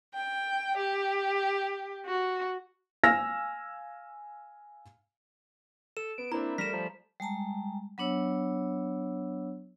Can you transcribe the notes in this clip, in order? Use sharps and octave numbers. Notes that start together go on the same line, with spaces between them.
G5
G4
F#4
F5 G#5 E6 F6 A#6
A4 E7
B3 D7
A#3 C4 D4 E4 A#5
G3 A3 A#4 B6 E7
F3
G3 G#3 A5 A#5
F#3 B3 D4 C#5 E6